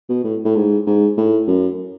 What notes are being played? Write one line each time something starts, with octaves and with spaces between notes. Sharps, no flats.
B2
A2
A2
G#2
G#2
A2
F#2